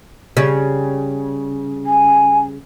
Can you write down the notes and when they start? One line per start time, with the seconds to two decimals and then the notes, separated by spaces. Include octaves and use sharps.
0.37 C#3 G3
1.86 G#5